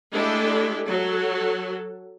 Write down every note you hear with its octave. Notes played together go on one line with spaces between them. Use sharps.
G#3 A3 D4 E4 G4 A4
F#3 A4